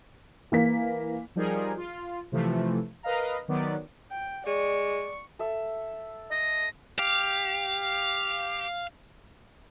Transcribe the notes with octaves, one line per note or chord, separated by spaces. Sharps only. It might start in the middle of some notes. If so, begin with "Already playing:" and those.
E3 A#3 B6
F3 G3 D#4 G#4 A#4
F4
C3 E3 F3 A3
A#4 B4 D#5 F5 A#5
D#3 F#3 B3 D5
G5
G#3 D5 C#6
A4 E5
D#5
G4 F5